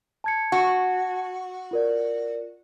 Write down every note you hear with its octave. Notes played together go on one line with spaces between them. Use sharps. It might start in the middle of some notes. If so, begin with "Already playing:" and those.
A5 G#6 C#7
F#4
F4 A#4 D5